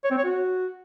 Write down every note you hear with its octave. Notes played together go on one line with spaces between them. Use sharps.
C#5
C4
C#5
F#4